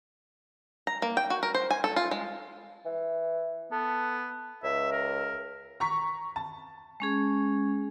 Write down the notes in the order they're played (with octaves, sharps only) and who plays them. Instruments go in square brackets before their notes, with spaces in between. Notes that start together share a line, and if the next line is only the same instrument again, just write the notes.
[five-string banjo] A#5
A#3
G5
F#4
A#4
C5
G#5
A4
F4
G#3
[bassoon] E3
[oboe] B3 [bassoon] A4
[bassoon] C#2 [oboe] E5
[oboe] A#4
[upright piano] A#5 C#6 B6
A5
[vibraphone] G#3 C#4 G#4